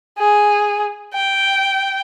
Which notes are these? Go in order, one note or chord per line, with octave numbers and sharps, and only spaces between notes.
G#4
G5